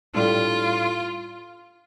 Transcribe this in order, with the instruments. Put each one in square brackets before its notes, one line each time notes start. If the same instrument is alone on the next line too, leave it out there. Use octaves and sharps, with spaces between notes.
[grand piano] A2 G3 D4 A4 [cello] F4